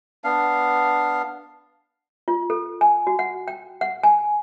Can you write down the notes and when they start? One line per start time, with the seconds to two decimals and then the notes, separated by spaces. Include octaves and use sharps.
0.24 B3 D4 F5
2.28 F4
2.50 A4
2.81 G#5
3.07 F#4
3.19 F#5
3.48 G5
3.81 F#5
4.03 G#5